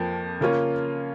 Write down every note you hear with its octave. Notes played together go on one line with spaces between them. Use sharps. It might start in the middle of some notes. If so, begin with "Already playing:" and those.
Already playing: F2 F3 A#3
C#3 A#3 C#4 F4